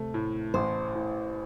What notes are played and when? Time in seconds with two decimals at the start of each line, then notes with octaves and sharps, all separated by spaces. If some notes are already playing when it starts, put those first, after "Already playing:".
Already playing: C3 A3
0.14 A2
0.54 A1 C5
0.95 A2